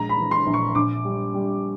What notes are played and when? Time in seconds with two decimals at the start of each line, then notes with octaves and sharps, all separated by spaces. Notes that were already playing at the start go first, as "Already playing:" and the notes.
Already playing: A#1 G#3 A#5
0.09 B5
0.17 E3
0.31 C6
0.46 A#1
0.54 C#6
0.75 A#1 D6
1.05 G3
1.34 G3